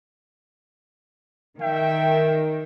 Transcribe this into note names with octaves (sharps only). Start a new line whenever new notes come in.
D#3 E5 G5